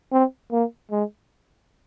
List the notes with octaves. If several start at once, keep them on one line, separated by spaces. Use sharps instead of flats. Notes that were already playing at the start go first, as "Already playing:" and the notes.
C4
A#3
G#3